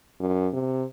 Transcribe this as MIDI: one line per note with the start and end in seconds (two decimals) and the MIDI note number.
0.20 0.48 42
0.53 0.84 48